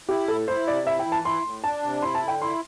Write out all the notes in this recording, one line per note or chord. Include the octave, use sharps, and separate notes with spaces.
E4 G4
A2 A4
E4 C5
C3 D5
E4 E5
G5
E3
A5
E4 C6
A2
D4 A5
C3
E4 C6
A5
D3
G5
E4 C6